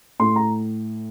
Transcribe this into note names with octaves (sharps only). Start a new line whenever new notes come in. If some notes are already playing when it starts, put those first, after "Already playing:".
A2 C6
A#5